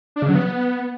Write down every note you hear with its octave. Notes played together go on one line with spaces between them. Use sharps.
D4
C#3
F#3
B3